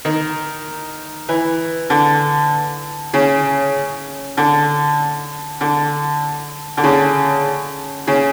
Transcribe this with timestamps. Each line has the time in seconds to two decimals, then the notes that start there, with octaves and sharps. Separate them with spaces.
0.05 D#3
1.29 E3
1.90 D3
3.14 C#3
4.37 D3
5.61 D3
6.77 D3
6.83 C#3
8.07 C#3